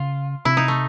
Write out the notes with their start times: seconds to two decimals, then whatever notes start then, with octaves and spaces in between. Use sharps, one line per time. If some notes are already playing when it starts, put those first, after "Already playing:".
Already playing: C#3 F4
0.45 C3 E4
0.57 D#4
0.68 A3